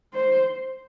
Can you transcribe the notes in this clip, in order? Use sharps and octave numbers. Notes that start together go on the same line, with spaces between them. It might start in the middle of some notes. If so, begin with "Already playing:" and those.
C5